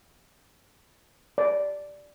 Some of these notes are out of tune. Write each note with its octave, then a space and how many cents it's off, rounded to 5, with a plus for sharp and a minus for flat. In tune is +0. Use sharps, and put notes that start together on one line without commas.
D5 -5